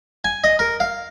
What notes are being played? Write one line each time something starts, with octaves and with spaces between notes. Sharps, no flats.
G#5
D#5
A#4
F5